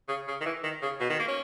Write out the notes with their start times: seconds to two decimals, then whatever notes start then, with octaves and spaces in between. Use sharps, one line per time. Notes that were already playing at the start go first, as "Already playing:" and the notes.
0.08 C#3
0.28 C#3
0.41 D#3
0.45 E3
0.63 D#3
0.82 C#3
1.00 B2
1.09 D#3
1.19 A#3
1.28 C#4